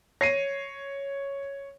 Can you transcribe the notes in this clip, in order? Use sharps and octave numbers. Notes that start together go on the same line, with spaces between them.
C#5 A#6 C7 D#7